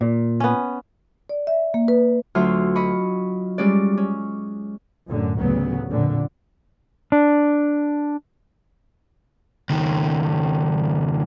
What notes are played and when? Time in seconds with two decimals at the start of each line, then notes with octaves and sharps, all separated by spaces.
0.01 A#2
0.40 B3 C#4
1.29 D5
1.47 E5
1.74 A#3
1.88 B4
2.35 D2 F#3 F4 E5 C6 F6
2.75 D#5 B5 C#6
3.58 G3 G#3 C#4 D5
3.97 C#4
5.08 F#2 A2 D3
5.38 A1 D2 C#3 F#3 B3
5.90 F2 A#2 D3
7.12 D4
9.70 C#2 D#3